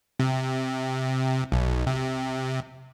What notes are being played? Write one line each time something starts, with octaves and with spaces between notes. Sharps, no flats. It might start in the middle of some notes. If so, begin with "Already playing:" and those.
C3
B1
C3